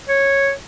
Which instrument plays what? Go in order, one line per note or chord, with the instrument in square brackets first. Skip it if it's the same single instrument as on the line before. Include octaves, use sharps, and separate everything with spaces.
[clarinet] C#5